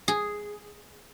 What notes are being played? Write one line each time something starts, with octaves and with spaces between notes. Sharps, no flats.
G#4